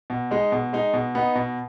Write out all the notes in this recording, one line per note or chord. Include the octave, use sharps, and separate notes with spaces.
B2
G#3 D#4
B2
G#3 D#4
B2
B3 D#4
B2